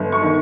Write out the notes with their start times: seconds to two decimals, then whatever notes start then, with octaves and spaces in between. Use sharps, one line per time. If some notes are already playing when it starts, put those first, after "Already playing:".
Already playing: G1
0.12 C#6
0.22 D#3